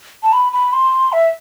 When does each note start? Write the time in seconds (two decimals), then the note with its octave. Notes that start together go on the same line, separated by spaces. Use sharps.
0.23 A5
0.33 B5
0.53 B5
0.73 C6
1.12 E5